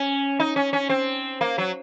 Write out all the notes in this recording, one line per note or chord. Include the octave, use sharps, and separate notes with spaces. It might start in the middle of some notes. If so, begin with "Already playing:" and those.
Already playing: C#4
D#4
C#4
C#4
C4
A#3
F#3